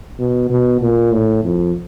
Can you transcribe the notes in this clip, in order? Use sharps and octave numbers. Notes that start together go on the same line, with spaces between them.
B2
B2
A#2
A2
F2